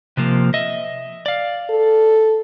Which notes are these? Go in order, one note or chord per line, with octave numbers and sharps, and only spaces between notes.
C3 F3 A#3
D#5 E5
D5 F5
A4